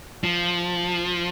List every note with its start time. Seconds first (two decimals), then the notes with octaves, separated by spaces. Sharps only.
0.24 F3